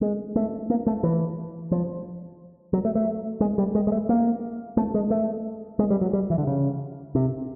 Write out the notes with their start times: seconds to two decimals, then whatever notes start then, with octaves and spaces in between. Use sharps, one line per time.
0.01 G#3
0.36 A3
0.70 A#3
0.87 A3
1.03 E3
1.71 F3
2.73 F#3
2.85 A3
2.95 A3
3.40 G#3
3.58 G3
3.75 G#3
3.87 G#3
3.92 A3
4.09 A#3
4.77 A3
4.94 G#3
5.10 A3
5.79 G#3
5.90 G3
6.01 F#3
6.13 G3
6.30 E3
6.38 D3
6.47 C#3
7.15 C3